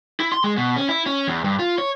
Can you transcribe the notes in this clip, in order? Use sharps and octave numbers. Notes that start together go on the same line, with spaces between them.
E4
C6
G#3
B2
C#4
E4
C#4
E2
G2
F4
C#5